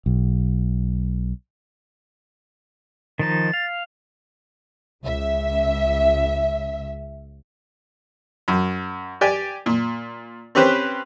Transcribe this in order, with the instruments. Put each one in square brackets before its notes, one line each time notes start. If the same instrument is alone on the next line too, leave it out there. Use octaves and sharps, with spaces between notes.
[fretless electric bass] B1
[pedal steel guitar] D#3 F3 D#4 [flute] A6
[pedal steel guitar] F5
[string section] C#2 C#3 E5
[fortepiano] F#2
G4 D5 G5 G#5
A#2
C4 C#4 G4 B4 C5